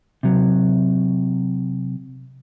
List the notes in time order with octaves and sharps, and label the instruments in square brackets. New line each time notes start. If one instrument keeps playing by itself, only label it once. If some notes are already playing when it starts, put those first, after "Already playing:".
[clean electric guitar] C3 F#3